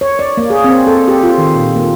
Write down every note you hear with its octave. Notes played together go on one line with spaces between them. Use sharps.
C#5
D5
A#3
G#4
C4
A4
G4
F4
D#3
A#2
A#3